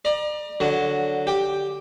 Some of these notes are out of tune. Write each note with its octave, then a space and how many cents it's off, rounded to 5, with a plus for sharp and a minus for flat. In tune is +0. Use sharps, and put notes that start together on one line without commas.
D5 +35 A#5 +35
D3 +0 F#3 +0
G4 +0 G5 +5